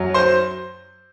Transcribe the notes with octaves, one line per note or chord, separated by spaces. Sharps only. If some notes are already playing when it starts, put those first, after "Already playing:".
Already playing: F#2 F#3
C5 C6